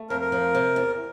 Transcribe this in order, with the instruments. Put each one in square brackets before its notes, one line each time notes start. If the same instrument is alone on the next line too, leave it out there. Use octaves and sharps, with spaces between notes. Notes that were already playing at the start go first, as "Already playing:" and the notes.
Already playing: [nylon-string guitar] A3
[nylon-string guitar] F2 [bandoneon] A#4
[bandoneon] A#4
[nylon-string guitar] F3
C3
E2